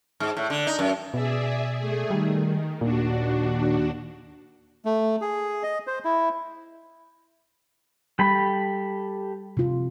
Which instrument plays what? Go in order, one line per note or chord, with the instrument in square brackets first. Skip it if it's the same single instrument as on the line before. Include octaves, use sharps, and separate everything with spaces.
[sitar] G#2
A2
D3
D#4
F#2
[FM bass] B2 [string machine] G#4 D5 E5
[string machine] A3 G#4
[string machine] D#3 [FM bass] G3
[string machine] D#2 D4 F#4 [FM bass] A#2
[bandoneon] A3
G#4
D#5
C5
E4
[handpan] G3 [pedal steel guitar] G4 A4 B5
[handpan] C3 F4